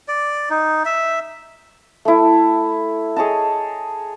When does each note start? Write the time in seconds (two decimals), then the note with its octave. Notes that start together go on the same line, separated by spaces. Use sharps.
0.08 D5
0.50 D#4
0.85 E5
2.05 A3 E4
3.16 G#4 C#5 D#5 A5